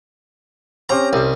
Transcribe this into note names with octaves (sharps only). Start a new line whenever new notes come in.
C4 C#4 G4 A#5
C2 C5 D#6